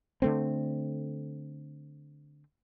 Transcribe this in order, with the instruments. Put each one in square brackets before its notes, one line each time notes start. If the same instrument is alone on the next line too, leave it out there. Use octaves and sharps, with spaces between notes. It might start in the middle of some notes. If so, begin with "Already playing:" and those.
[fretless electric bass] D3 A3 C4